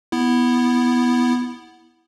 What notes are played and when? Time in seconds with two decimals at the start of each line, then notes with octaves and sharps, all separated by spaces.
0.12 B3 E4